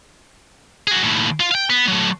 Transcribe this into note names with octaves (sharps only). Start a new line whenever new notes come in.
F#4 G#4
D#2 A2
F4
F5 G5
B3
F#3 A3